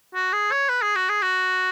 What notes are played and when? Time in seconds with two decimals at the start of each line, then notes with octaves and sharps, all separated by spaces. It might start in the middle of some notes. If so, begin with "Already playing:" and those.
0.15 F#4
0.33 G#4
0.51 C#5
0.69 B4
0.82 G#4
0.96 F#4
1.09 G#4
1.22 F#4